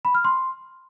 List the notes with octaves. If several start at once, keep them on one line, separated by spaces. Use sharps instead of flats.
B5
F6
C6